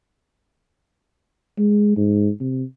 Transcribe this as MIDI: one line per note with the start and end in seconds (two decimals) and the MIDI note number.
1.58 1.95 56
1.97 2.29 44
2.40 2.63 48